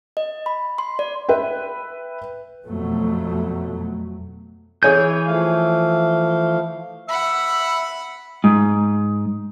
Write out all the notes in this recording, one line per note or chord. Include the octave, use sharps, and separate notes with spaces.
D#5
B5
C6
D5
B4 E5 G5
F2 B2 F#3 A3
E3 G#4 C#5 G#5 G6
F3 A3 F5
E5 F#5 B5
G#2